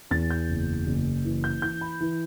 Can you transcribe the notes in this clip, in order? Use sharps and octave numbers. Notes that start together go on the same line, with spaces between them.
E2 A6
G6
F#1
F#1
E3
G6
E3 G6
B5
E3